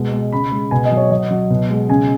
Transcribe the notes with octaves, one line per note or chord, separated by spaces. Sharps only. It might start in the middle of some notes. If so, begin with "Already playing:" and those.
Already playing: B2 G#3
G#3
C#3 B5
G#3
B2 G#5
D#5
F#3
C#5
F#3 D#5
F#3
B2
G#3
C#3 G#5